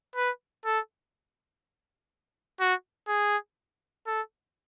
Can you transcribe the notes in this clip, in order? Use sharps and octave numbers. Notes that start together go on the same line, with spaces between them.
B4
A4
F#4
G#4
A4